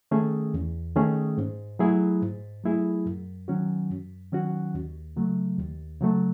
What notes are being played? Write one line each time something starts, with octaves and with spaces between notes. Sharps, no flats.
D#3 A3 C#4 G#4
E2
D#3 A3 C#4 G#4
G#2
F#3 A3 E4 G#4
G#2
F#3 A3 E4 G#4
F#2
D#3 F#3 C#4 F#4
F#2
D#3 F#3 C#4 F#4
D#2
C#3 F#3 A3
D#2
C#3 F#3 A3